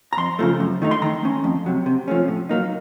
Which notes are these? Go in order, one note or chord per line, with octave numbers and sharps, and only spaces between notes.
A#5
F2 C6
C#3 F3 A3
F#2
D#3 A3 D#4
C6
D#3 A#5
A3 C#4
F2
C3 F#3
C3
F3 A3 C#4
A2
F#3 A#3 D#4